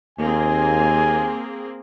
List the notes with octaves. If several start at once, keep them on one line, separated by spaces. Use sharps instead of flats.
D#2 A#3 C4 G#4 G#5